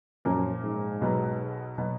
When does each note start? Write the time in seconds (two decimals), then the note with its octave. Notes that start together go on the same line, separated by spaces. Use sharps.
0.25 F#2 A#2 F3 A#3
0.63 G#2
1.01 B1 B2 F#3 B3
1.78 B2 F#3 B3